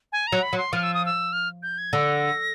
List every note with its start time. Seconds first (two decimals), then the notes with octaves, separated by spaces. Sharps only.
0.12 G#5
0.27 A#5
0.32 F#3
0.43 B5
0.53 F#3
0.58 C6
0.73 F3 F6
0.83 E6
0.94 D#6
1.06 E6
1.33 F6
1.63 G6
1.78 G#6
1.93 D3 A#6